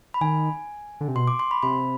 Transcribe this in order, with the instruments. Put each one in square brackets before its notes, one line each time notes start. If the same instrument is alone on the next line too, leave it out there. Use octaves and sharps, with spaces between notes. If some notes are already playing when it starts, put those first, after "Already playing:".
[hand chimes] B5
[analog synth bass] D#3 [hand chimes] G#5
[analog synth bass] D3
C3
[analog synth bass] B2 [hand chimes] C6
[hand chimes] D6
C6
B5
[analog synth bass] C3 [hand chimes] B5